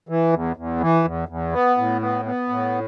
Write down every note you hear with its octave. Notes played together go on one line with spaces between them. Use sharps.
E3
E2
E2
E3
E2
E2
B3
A2
B3
B3
A2